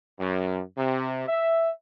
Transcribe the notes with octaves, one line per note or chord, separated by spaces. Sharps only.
F#2
C3
E5